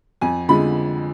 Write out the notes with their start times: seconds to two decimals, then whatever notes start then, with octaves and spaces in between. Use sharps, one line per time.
0.21 F2 G#5
0.49 D3 F3 G#3 B5